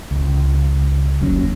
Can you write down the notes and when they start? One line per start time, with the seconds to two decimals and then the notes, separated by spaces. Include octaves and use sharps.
0.11 C#2
1.21 F1 D#2 F#3 C#4